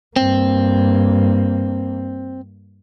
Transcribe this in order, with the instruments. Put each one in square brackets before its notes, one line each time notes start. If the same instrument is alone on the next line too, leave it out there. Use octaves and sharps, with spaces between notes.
[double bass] G2 A#3 [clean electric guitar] C4